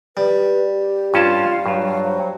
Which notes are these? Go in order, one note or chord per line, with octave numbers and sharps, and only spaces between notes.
G3 B4
G4
G2 C#4 F4 F5 A5
G2 F#3
C5